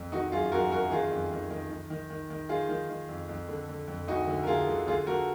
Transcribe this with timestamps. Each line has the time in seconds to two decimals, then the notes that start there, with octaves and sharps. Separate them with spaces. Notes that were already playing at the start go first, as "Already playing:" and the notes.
Already playing: F2
0.12 D#3 D#4 F#4
0.32 F#2 F4 G#4
0.52 F#2 F#4 A#4
0.71 F#2 F#4 A#4
0.91 D#3 F4 G#4
1.11 F2
1.31 D#3
1.50 D#3
1.70 D#3
1.90 D#3
2.10 D#3
2.30 D#3
2.49 D#3 F4 G#4
2.69 D#3
2.90 D#3
3.09 F2
3.29 F2
3.48 D3
3.69 D3
3.88 F2
4.07 D2 D#4 F#4
4.27 D3
4.43 A#4
4.47 D3 F4 G#4
4.67 D3
4.87 D3 F4 G#4
5.06 D3 F#4 A#4